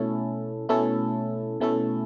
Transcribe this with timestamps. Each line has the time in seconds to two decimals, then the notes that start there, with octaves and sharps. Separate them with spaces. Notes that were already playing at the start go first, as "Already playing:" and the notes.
Already playing: B2 A3 C#4 E4 A4
0.69 B2 A3 C#4 E4 A4
1.60 B2 A3 C#4 E4 A4